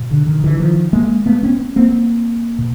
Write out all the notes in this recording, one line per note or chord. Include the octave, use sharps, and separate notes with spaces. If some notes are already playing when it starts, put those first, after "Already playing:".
Already playing: B2
D3
D#3
D3 E3
D#3 F3
G#3 A#3
A3 B3
B3 C#4
A#3 C4
B2